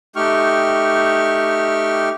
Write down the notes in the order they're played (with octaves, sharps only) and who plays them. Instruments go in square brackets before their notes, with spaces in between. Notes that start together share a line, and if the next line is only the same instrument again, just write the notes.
[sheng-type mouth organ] A3 D#4 G4 G5 C#6 F6